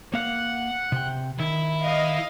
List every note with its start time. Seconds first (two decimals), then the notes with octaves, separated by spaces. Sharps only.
0.14 A#3 F5 F#5
0.92 C3 G5
1.39 D#3 E4
1.82 D#5 F5